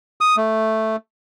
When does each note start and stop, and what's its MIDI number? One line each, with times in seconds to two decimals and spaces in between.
0.21 0.36 87
0.37 0.96 57